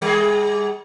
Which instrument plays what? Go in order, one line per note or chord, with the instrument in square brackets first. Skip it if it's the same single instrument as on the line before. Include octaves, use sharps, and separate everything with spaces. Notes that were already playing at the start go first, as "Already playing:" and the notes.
[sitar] G3 G#4